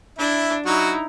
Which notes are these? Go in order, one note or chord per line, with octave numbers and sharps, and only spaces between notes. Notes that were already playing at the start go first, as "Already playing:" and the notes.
D4 E4 E5
F#3 D#4 E4 F#4